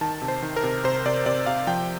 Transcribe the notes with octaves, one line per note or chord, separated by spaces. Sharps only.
D#3 A5
C3
C5
D#3
A#4
C3
C3 C5
C3 D5
C3 D5
C3 F5
F3 G5